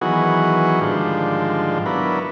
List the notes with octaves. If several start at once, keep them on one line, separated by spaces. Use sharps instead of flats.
D#3 E3 F#3 B3 F#4 G#4
G#2 D3 D#3 F3 G3
F#3 B3 D4 E4 A#4 B4